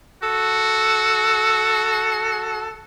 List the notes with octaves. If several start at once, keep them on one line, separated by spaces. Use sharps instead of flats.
F#4 A4